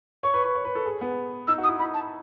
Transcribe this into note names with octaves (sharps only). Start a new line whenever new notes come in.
C#5 C#6
B4
B4
C#5
B4
A4
G#4
B3
D#4 E6
F#4
D#6
E4
D#4 B5
A5